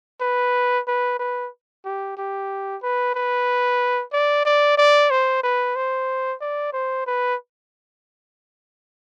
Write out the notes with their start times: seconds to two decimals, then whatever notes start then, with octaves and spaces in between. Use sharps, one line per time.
0.21 B4
0.87 B4
1.19 B4
1.85 G4
2.17 G4
2.83 B4
3.14 B4
4.13 D5
4.45 D5
4.78 D5
5.10 C5
5.43 B4
5.76 C5
6.41 D5
6.73 C5
7.07 B4